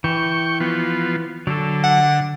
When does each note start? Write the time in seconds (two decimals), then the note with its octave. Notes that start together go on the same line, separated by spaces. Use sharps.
0.04 E3 G5 C#6
0.60 F3 B3
1.47 D3 F#3 A4
1.84 F#5